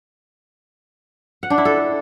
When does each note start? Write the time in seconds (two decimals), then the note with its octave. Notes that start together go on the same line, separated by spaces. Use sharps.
1.43 F#5
1.50 D4
1.58 E4
1.65 A4